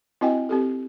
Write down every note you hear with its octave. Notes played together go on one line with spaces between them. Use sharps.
C4 E4 F#4 D#5 G5 G#5
C4 G4 A4